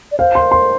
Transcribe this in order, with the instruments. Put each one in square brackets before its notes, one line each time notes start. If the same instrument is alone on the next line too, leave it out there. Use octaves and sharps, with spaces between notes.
[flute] D5
[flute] C5 [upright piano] F5
[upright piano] C6
C6